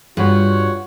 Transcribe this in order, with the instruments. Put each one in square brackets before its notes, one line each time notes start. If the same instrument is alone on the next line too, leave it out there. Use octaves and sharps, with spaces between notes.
[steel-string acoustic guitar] G2 [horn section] F4 F#4 C#5